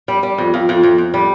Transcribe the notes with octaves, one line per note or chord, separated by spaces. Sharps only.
G3
G3
F2
F2
F2
F2
F2
G3